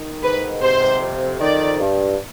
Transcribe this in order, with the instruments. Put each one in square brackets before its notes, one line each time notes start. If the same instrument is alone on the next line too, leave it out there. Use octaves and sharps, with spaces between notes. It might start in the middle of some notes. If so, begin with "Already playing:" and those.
Already playing: [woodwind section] D#3
[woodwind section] G#2 [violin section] B4
[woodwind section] C3 [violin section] C5
[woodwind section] F2
[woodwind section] D#3 [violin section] D5
[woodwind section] G2